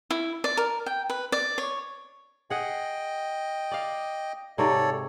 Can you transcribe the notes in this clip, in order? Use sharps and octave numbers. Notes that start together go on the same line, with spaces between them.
E4
D5
A#4
G5
B4
D5
C#5
G#4 D#5 F#5 G5
D5 F5
G#2 C3 A4 C#5 D5